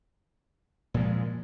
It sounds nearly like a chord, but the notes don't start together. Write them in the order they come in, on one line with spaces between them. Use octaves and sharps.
A#2 F3 G#3